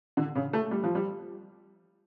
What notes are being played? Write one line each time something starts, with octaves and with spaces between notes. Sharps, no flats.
D3
C#3
A3
G3
F3
G3